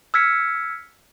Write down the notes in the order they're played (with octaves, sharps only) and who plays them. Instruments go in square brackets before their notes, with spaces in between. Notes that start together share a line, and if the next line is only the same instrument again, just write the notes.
[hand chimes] E6 F6 G#6 B6 C#7